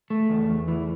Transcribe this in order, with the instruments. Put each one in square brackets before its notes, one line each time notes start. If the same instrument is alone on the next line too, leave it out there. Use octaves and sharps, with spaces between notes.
[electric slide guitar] A3
E2
E2
E3